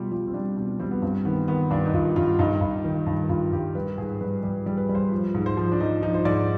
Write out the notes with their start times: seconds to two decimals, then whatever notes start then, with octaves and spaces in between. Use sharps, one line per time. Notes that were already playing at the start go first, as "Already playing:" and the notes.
Already playing: B2 G3 F4 G4
0.11 G3 F4
0.27 C4
0.34 G3 D4
0.57 B2 D4
0.79 G3 C4
0.91 B3
1.02 G2 C4
1.25 D#3 B3
1.48 D#3 B3
1.71 G2 D4
1.86 D#4
1.94 G2 F4
2.16 G2 F4
2.39 G2 D#4
2.61 G2
2.84 D#3
3.07 G2
3.29 G2 F4
3.52 G2 G4
3.75 G3 B4
3.98 G#2 G#4
4.21 G3 B4
4.43 G3 B4
4.66 G3
4.77 B4
4.89 G3
4.95 C5
5.12 F3
5.35 G#2
5.46 C5
5.57 F3
5.72 D4
5.80 F3 D#4
6.02 F3 D#4
6.14 C5
6.25 G#2 D5